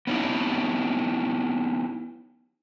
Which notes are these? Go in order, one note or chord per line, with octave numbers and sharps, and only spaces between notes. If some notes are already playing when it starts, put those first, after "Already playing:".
B3 C#4 D#4 E4